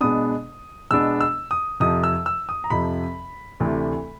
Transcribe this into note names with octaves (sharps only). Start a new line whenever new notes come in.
B2 G#3 B3 D4 D#6
B2 G#3 B3 D4 E6
E6
D#6
F2 C3 F3 D#6
E6
E6
D#6
A#5
F2 C3 F3 B5
D2 C3 E3 A3